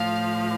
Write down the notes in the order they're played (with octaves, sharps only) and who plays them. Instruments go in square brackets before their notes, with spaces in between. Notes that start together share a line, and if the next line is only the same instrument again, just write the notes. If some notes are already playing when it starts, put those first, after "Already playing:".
Already playing: [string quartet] A2 F3 F5